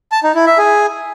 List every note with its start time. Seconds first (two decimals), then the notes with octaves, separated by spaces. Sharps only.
0.12 A5
0.23 D#4
0.35 E4
0.46 E5
0.58 G#4